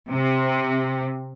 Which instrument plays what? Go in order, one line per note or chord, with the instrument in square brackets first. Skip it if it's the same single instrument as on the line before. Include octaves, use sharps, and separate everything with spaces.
[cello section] C3